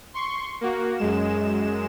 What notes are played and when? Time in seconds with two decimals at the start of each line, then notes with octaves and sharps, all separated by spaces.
0.14 C6 C#6
0.61 A#3 F#4
0.98 F#2 G#3 E7